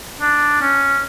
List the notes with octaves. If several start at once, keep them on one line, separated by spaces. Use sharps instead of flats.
D4
C#4